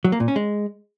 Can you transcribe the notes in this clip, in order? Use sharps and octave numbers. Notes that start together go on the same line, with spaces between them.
F#3
A#3
A#2
C#4
G#3